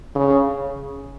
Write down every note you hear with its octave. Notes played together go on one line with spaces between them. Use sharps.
C#3